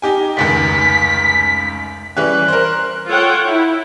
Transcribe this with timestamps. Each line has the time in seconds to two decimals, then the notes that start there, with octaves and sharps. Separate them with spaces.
0.02 D#4 G4 G#5
0.37 F1 C#2 D#3 B6
2.17 E3 G3 C#4 F#6
2.48 A#4 C5
3.07 F4 A4 C#5 F#5 G5
3.46 E4